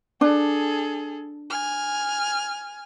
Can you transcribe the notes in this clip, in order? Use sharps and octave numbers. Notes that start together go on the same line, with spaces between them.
D4 G#4 A4
G#5 F6